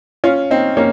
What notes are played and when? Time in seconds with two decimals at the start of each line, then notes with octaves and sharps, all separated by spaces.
0.24 C#4 F4
0.51 C4 D#4
0.77 A#3 C#4